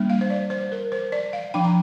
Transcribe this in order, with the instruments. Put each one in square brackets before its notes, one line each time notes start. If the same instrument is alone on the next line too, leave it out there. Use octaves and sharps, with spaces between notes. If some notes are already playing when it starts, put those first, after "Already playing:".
Already playing: [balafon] G3 A#3 D4
F5
C5
D5
C5
A#4
C5
D5
F5
F3 D4 G5
A#5